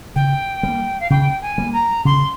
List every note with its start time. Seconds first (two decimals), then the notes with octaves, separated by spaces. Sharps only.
0.16 C#3 G5
0.63 G3 A#3
1.00 F5
1.10 C#3 G5
1.42 G#5
1.58 G3 A#3
1.73 A#5
2.05 C#3 C6